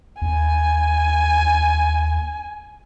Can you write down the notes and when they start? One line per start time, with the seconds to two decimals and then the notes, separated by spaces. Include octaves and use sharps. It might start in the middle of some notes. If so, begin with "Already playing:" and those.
0.22 D#2 G#5